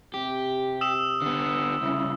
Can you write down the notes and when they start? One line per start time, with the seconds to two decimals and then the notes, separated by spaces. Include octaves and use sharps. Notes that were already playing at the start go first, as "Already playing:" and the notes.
0.14 C3 G4
0.81 D#6 E6 E7
1.22 D3 B3
1.82 C2 C#3 E4